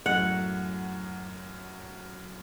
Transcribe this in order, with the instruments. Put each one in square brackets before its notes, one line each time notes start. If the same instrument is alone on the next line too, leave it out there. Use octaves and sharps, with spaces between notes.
[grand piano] F#2 A2 [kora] F#5